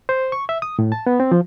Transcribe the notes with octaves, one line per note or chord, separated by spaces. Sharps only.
C5
C#6
E5
D#6
A2
A5
B3
C4
F3